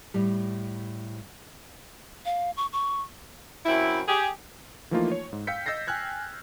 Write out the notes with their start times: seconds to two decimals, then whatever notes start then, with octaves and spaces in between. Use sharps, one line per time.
0.14 A2 G3
2.25 F5
2.57 C#6
2.73 C#6
3.66 F#2 C4 E4
4.08 G4 G#4
4.91 E3 F3 A3 A#3 D#4 F4
5.12 C#5
5.33 G#2
5.47 F5 G5 E6 G6 B6 C#7
5.66 D#5 E6 G6 A6 A#6 C7
5.87 G5 G#5 F6 F#6 G#6